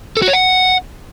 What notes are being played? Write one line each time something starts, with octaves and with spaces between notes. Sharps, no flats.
A4
F#4
C#5
F#5